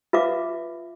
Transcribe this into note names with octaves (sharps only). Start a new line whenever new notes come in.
F4 B4 E5 F5 D6